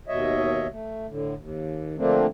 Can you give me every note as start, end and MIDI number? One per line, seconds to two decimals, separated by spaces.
0.08 0.67 39
0.08 0.67 47
0.08 0.67 73
0.08 0.67 75
0.08 0.67 76
0.71 1.06 57
1.08 1.34 45
1.08 1.34 50
1.38 1.96 39
1.98 2.26 50
1.98 2.26 53
1.98 2.26 57
1.98 2.26 58
1.98 2.26 60
1.98 2.26 62